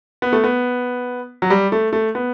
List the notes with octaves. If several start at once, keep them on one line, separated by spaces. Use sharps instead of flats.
B3
A3
B3
F#3
G3
A3
A3
B3